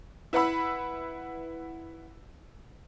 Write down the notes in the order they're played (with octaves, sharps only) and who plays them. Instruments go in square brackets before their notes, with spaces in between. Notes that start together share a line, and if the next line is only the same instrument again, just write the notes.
[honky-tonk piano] E4 B4 F#5 B5 E6